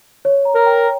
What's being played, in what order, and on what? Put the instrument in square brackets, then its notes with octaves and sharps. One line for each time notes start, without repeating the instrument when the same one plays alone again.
[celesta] C#5
A#5
[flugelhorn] A#4
[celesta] G5